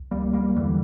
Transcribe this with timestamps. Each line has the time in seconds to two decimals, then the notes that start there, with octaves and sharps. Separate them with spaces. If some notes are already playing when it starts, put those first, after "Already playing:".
Already playing: C#2
0.11 G3 A#3
0.33 G3 A#3
0.56 E2 D3 E3 G3